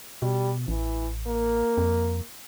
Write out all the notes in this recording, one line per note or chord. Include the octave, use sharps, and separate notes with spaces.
B2 G3
A1 E3
A#3
F2